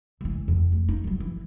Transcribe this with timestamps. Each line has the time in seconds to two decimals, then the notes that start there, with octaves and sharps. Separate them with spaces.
0.21 C#2 E3
0.48 F2
0.72 A3
0.89 D#4
1.04 F3 F#3
1.20 E3